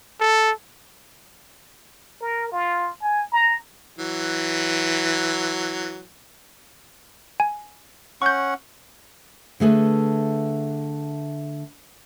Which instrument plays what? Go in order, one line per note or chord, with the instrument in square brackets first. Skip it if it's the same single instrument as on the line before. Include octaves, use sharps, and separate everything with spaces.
[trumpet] A4
[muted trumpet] A#4
F4
G#5
A#5
[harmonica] E3 F#3
[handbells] G#5
[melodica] C#4 F#5 [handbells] C#6 G6
[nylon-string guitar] D3 A3 G#4 B4